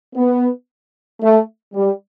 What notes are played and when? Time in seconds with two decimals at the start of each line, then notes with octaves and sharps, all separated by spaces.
0.15 B3
1.22 A3
1.74 G3